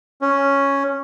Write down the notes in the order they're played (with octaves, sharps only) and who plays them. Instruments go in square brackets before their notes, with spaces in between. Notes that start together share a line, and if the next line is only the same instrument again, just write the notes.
[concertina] C#4